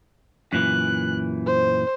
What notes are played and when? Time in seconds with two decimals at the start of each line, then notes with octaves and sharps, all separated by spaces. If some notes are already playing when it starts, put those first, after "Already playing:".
0.53 F#2 A#2 E3 F#6
1.46 C5